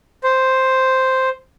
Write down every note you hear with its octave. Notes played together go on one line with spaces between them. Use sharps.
C5